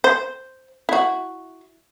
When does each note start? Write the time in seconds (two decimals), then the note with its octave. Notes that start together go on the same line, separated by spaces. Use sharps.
0.04 C5
0.89 E4 F#4